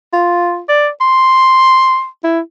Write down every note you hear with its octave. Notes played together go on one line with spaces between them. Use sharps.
F4
D5
C6
E4